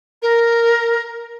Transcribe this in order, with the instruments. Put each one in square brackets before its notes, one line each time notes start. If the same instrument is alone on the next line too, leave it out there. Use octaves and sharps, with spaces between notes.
[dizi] A#4